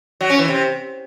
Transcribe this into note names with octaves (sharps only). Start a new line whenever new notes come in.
F#3
C#4
E3
C3